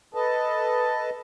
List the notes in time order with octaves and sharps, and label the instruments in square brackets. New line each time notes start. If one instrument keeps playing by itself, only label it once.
[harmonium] A4 B4 D#5 A5